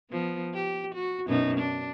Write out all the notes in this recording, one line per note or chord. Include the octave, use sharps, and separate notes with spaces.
F3 B3
G4
F#4
F#2 B2 D#4
D4